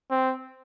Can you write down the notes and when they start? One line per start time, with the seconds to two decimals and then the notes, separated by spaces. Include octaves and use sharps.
0.11 C4